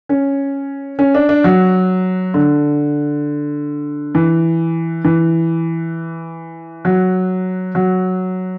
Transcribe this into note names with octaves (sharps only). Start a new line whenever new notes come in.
C#4
C#4
D4
D4
F#3
D3
E3
E3
F#3
F#3